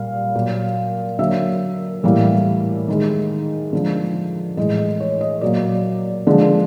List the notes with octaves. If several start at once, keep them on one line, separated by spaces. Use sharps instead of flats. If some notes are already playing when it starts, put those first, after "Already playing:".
Already playing: A#2 G3 A#3 F5
A#2 F#3 A#3
D3 F#3 A#3 E5
A2 E3 G3 A#3
D#3 G#3
D3 F3 G#3
A2 E3 G#3 D#5
D#5
C#5
D#5
A#2 F#3 A#3 D5
D3 F3 G#3